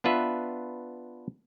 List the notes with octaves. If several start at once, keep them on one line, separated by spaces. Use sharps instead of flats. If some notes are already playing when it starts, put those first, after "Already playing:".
B3 D4 F4 B4 E5